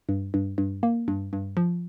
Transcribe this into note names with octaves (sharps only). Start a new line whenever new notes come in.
G2
G2
G2
A#3
G2
G2
F3